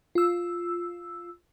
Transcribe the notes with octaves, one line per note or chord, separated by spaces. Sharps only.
F4 E6